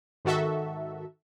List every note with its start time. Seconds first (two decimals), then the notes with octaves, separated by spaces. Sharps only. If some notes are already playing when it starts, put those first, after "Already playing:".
0.25 G#2 D#3 F#4 A4 E5